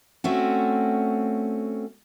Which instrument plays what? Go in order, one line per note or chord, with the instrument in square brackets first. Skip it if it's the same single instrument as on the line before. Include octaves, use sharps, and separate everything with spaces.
[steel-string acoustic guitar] A3 C4 C#4 F#4